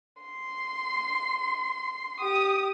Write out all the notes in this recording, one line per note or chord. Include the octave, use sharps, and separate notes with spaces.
C6
G4 D#6